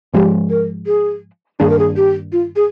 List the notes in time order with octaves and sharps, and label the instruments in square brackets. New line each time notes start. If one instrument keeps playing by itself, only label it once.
[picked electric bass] G#2 F3 G#3 [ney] G4
[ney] A#4
G#4
[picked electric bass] G2 D#3 A#3 D4 [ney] G#4
[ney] A#4
G#4
G4
F4
G#4